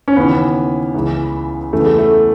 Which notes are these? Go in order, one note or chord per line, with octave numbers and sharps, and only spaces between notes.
C#4
D#2 C#3 E3 B3
C#2 C#3 E3
E2 C#3 E3 A3
B3
A3
A3